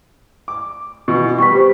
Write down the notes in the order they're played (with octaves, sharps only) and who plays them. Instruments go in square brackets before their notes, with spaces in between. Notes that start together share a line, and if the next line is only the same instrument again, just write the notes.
[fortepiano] D6
B2 E3
[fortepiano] G3 B3 [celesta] C#6 D6 B6
[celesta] G4 C5